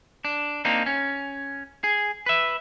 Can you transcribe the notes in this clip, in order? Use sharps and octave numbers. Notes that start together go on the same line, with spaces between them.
D4
A#3 C4 D4 D#4
C#4
G#4
B4 E5